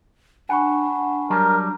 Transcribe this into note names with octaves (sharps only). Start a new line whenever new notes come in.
D4 F#5 G#5 B5 C#6
F#3 G3 A#4 A5